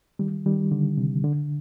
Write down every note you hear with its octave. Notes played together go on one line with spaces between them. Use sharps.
D#3 G3
D#3 G3
D3
C3
D3